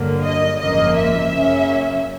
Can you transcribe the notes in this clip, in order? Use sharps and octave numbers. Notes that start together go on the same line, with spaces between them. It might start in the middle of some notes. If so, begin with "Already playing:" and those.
Already playing: G2 D3 F#3 A#3
D#5
G#1 F#2 C#3 F3 A#3 D#5
E5
F#2 C#3 F#3 A#3 C#4